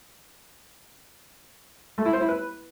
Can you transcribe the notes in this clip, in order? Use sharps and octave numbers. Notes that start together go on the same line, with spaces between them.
A3
E4
C5
E4
B4